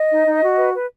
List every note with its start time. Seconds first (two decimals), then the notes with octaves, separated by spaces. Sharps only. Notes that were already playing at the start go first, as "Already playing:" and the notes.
Already playing: D#5
0.09 D#4
0.26 D#4
0.42 F#4
0.58 B4
0.74 B4